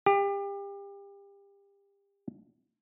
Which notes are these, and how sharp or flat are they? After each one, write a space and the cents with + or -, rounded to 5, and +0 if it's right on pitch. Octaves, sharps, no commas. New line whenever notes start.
G4 +30